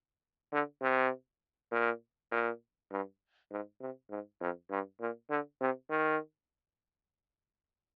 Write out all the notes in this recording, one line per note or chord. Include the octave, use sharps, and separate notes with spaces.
D3
C3
A#2
A#2
G2
G#2
C3
G#2
F2
G2
A#2
D3
C3
D#3